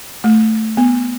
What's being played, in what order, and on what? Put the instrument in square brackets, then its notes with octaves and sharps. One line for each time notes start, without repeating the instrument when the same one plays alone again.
[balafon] A3
B3